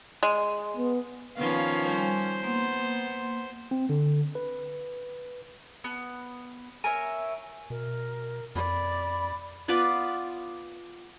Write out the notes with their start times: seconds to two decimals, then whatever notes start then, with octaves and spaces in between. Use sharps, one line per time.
0.23 G#3
0.77 B3
1.37 D#3 F3 B3 C#4 F5
1.85 G3 C5 G#5
2.41 A#3 B3 C6
3.71 C4
3.89 D3
4.35 B4
5.84 B3
6.84 A#4 C#5 E5 G#5
7.70 B2 A#4
8.55 F2 D5 B5
9.68 B3 F4 B4 D5